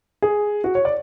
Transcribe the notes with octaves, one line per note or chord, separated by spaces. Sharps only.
G#4
F#4
C#5
D5